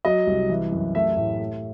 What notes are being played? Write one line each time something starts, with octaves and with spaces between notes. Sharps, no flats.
F#3 D#5
C2
E3
F#2
A3 E5
A2
A3